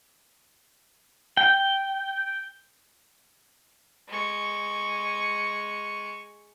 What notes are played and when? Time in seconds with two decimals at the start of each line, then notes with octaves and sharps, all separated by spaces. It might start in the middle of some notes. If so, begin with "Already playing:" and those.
1.37 G5
4.09 G#3 C#6